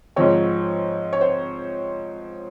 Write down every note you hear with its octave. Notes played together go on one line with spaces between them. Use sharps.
G#2 F3 C4 C#5
C#5
C5